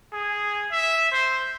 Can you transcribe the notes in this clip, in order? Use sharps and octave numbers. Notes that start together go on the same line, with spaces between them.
G#4
E5
C5